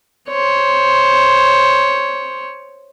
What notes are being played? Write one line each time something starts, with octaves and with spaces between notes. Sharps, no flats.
C5 C#5